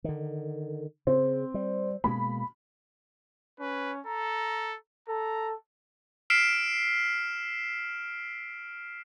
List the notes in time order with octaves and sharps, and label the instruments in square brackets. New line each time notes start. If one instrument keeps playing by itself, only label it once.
[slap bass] D3 D#3
[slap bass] C#3 [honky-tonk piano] C4
[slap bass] G3
[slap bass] B2 G#3 A#3 [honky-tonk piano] B5
[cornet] C#4 [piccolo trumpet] B4
[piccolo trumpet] A4 [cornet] A#5
[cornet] A4 [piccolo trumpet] A#5
[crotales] E6 F6 B6 C7 D7 E7